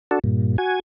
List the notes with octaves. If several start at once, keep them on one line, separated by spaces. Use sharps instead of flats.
D4 F#4 A4
G2 A#2
F#4 G#5